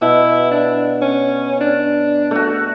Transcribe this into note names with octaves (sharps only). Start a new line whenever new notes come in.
B2 E4
D4
C#4
D4
A3 F#4